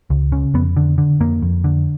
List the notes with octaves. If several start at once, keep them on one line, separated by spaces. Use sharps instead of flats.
C#2
C#3
F2 B3
D3
D3
F2 A#3
F2
D3